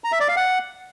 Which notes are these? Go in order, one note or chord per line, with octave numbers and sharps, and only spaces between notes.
A#5
E5
D5
F5
F#5